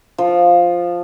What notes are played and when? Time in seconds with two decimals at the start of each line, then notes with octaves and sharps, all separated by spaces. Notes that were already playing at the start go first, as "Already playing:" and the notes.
0.18 F3